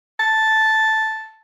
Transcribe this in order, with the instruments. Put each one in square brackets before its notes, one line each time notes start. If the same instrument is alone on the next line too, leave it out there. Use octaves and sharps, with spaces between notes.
[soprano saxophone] A5